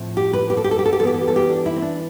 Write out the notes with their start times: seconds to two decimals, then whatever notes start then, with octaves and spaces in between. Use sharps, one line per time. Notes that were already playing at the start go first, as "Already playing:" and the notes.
Already playing: A2 F3 C4
0.17 G4
0.33 B4
0.50 G4
0.57 A4
0.64 G4
0.71 A4
0.79 G4
0.86 A4
0.93 G4
0.99 E3 A4
1.04 B3 G4
1.14 A4
1.21 G4
1.28 A4
1.36 G4
1.49 D4
1.66 E4
1.76 C4
1.82 D4